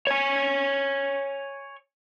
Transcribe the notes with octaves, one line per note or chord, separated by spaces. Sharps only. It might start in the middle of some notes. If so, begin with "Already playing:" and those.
C#5 G#5